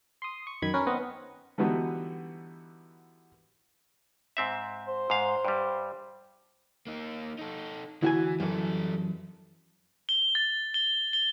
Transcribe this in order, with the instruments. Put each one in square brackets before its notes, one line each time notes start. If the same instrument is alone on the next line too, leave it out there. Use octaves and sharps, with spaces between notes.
[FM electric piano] C6 D#6
C#6
F#2 D#3 B5 G#6
C#4 A#4 B4
B3 C4 D#5 F#5
[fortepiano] D3 E3 G3 B3 D#4 F#4
[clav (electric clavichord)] G#2 C4 E5
[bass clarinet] C5
[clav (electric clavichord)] G#2 F5
G2 G3
[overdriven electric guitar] A#3 D#4
D#4 A4
[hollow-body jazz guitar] D2 F#4 G#5 [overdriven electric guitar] E3 [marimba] E4
[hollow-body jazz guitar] F#2 E3 [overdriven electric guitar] G3 A4
[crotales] G7
A6
G7
G7